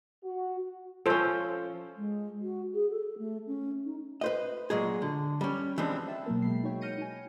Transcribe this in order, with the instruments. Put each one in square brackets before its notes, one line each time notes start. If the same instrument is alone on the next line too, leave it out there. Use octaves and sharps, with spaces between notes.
[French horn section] F#4
[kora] F3 C#4 [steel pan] A4 C5
[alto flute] G#3
F#4
G#4
A4
A3
C#4
D#4
[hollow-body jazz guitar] B4 C5 D#5
A#2 F#3 G#3 G#4
D3
G3 C#4
E3 F3 G3 G#3 C4 D4
[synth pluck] E5 G5 A5 E6
B2 F#3 A#3 A#4
G#3 B5 C7
D#4 F#4 C#5 G5
F6 G6 A#6 C#7 D#7
D#4 G#5